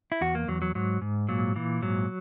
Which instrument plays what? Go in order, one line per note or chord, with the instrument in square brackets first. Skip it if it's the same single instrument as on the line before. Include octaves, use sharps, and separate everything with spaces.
[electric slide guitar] E4
E2 F#4
A#3
E2 F#3
F#3
G#2 F#3
G#2
A#2 F#3
A#2 E3
G#2 F#3